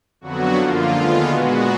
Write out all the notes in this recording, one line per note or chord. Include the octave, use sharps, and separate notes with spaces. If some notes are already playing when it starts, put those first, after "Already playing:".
F2 D3 F#3 B3 F#4
F#2 D3 F3 A#3 F4
D#2 D3 G#3 B3 F4
A#2 G#3 B3 F#4